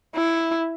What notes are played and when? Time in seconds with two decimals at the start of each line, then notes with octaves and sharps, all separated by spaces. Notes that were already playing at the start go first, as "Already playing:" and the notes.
0.16 E4